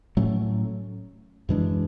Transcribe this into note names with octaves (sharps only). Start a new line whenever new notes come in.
A2 F#3 A3 C#4
F#2 E3 G#3 D4